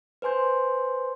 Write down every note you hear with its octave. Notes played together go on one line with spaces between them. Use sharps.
B4 C5 G#5 C6 G6